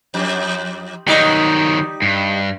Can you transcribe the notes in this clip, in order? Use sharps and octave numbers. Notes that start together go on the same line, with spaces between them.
F2
D#3 F#3 G3 D#4
G2